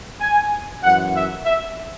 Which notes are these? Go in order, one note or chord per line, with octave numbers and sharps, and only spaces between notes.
G#5
F#2 E3 F#5
E5
E5